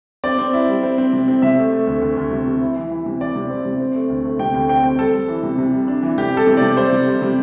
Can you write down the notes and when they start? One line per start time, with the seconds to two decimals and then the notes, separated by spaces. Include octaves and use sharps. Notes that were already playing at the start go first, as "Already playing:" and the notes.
0.24 C4 D5
0.38 C4
0.53 E4
0.68 G3
0.83 C4
0.98 C4
1.13 C3
1.28 C4
1.42 C3 E5
1.57 A3
1.72 A3
1.87 D2
2.02 D2
2.17 D2
2.31 C3
2.46 C3
2.61 E4
2.76 E3
2.91 E3
3.06 C3
3.21 E3 D5
3.36 C3
3.50 C4
3.65 C3
3.80 C4
3.95 A3
4.10 D2
4.25 A3
4.39 C3 G5
4.54 D2 G5
4.69 C4 G5
4.84 C4 G5
4.99 G3 A4
5.14 G3
5.28 E3
5.43 C3
5.58 C3
5.73 G3
5.88 D4
6.03 E3
6.18 C3 G4
6.33 G3 A4
6.47 C3
6.57 C3 D5
6.77 G3 C5
6.92 C3
7.06 G3
7.22 C3